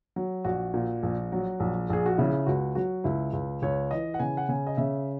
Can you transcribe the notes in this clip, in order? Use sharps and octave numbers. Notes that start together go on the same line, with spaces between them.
F#3
A#1 F#4
A#2
A#1
F#3
A#1
A#1 G#4
F#4
C#3 E4
C#2 F#4
F#3 F#4
C#2 E4
C#2
C#2 C#5
E3 D#5
F#5
C#3 G#5
F#5
C#3 G#5
D#5
C#3 E5